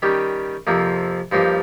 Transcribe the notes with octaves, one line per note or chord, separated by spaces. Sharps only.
D#3 G3 C#4 G4
F2 C3 F3 A#3
G2 F3 A#3 D#4 G4